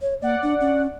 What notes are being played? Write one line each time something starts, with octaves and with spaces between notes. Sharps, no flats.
C#5
A#3 D5 F#5
D4
C#4